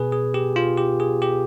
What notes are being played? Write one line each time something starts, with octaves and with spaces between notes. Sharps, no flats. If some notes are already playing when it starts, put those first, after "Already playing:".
Already playing: B2 B3 G#4 B4 G#5
G#4
G4
F4
G4
G#4
G4